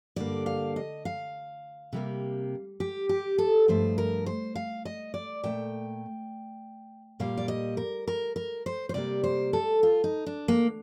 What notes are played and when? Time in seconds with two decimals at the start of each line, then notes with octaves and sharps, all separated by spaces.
0.16 G2 D3 G3 A#3 D5
0.46 F5
0.76 D#5
1.05 F5
1.93 C3 G3 A#3
2.80 G4
3.09 G4
3.38 A4
3.68 G2 F3 A3 C5
3.98 A#4
4.26 C5
4.55 F5
4.85 D#5
5.14 D5
5.43 A#2 A3 G5
7.20 A#2 G3 A#3 F5
7.38 D5
7.48 D#5
7.77 A#4
8.08 A#4
8.36 A#4
8.66 C5
8.89 C5
8.94 C3 G3 A#3 D5
9.24 C5
9.53 A4
9.83 F4
10.04 D#4
10.26 D4
10.48 A#3